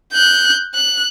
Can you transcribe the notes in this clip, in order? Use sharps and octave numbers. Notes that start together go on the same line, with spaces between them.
F#6 G6
F#6